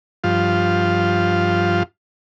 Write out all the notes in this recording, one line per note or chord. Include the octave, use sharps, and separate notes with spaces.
G2 F3 F4